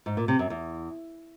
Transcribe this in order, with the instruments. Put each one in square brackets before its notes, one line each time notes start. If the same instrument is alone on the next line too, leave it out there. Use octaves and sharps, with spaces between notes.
[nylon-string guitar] G#2
A#2
C3
F#2
E2